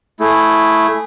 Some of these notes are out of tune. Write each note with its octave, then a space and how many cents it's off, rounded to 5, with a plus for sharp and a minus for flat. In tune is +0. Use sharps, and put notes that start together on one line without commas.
A3 +0 E4 +0 G#4 +0